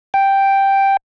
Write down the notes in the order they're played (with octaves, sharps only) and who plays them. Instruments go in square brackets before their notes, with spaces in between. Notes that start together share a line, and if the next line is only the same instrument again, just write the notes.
[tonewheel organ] G5